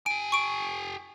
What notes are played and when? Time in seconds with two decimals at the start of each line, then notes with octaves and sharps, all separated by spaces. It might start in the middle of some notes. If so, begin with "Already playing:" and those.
0.06 G4 G#5 D7
0.32 C#6 D7